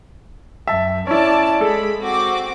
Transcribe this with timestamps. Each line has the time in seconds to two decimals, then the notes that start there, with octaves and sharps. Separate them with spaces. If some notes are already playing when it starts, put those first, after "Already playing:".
0.67 F#2 E5 A5
1.07 C#4 E4 D5 A5
1.61 G#3 A4 B5
2.00 C4 F#4 D6